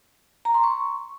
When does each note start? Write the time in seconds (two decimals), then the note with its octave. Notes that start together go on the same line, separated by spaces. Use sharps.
0.45 A#5
0.54 C6
0.64 C#6